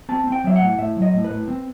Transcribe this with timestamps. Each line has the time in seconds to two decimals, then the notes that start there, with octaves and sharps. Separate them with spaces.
0.09 C4 A5
0.27 C4 G5
0.44 F#3 E5
0.56 F#5
0.61 A2
0.79 A2 E5
0.97 F#3
1.02 D#5
1.14 A2
1.24 B4
1.31 A2
1.48 C4